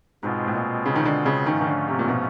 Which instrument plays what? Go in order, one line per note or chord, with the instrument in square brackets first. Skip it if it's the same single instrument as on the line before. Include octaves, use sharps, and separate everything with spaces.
[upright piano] G#2 [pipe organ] B2 G#3 C4 F4
[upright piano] A2
A#2
C#3
D#3
D3
C#3
[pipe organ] G#2 F3 A3 C#4 [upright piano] D#3
[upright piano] D#3
D3
C3
A#2
B2